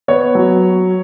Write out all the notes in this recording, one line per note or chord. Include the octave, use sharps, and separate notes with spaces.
B3 C#5
F#3